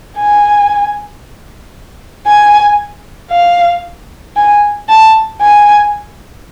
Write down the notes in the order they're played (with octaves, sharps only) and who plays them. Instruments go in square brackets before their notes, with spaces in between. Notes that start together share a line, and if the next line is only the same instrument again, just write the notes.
[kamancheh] G#5
G#5
F5
G#5
A5
G#5